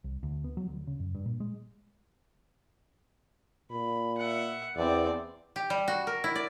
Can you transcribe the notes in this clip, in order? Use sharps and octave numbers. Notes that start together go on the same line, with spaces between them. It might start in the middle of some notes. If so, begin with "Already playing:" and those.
C2
D2
B3
F#3
D2
C#3
F#2
G2
A#2
G#3
A#2 B5
E5 F#5
E2 C4 D5
G4
G3
F#4
A#4
E4
D5